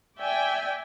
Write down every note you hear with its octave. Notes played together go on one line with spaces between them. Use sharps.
D5 E5 G5 G#5